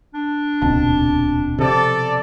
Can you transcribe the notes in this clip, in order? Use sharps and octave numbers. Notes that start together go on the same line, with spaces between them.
D4
D#1 C#2 B2 C4 A5
C3 F3 A4 D5